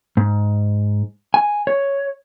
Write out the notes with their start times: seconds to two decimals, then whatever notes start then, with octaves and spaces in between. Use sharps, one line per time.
0.17 G#2
1.34 G#5
1.67 C#5